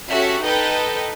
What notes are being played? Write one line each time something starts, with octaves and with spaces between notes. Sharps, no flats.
C#4 F#4 G4 A4 E5
D#4 A4 B4 D#5 G5